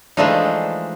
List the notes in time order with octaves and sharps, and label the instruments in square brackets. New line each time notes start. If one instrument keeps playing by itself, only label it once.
[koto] E3 F3 G#3 A3 D4 D#4